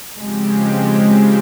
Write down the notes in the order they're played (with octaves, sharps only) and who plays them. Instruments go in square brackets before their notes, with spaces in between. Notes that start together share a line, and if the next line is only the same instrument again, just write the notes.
[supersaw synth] C#3 F3 C4 G4 [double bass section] G#3